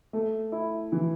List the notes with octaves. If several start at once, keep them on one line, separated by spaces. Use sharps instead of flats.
A3
E4
E3